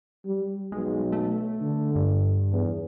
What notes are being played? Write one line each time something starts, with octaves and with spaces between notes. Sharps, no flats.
G3
B1 G#3
A3
D3
G2
E2